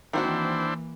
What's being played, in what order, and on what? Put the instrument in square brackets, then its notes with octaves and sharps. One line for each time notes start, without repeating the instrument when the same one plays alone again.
[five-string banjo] D#3 C4 F#4 [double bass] E3 A#3 [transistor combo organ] D4 E4 C5